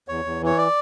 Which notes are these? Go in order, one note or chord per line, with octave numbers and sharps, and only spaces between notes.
E2 C#5
E2
E3 C#5
D5